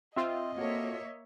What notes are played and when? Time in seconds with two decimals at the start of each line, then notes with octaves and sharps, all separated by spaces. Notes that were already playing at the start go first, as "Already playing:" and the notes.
0.16 C4 F4 D#5 E5 G5 C6
0.58 A#3 F#4 A4 C#5 E5